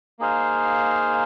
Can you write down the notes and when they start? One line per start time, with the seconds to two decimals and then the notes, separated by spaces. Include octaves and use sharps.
0.19 A#3 D#4 G#4 C5 F5